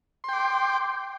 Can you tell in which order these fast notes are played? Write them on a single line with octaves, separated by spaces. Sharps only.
C6 G5 D6